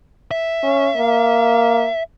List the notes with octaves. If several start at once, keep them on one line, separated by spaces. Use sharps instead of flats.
E5
C#4
A#3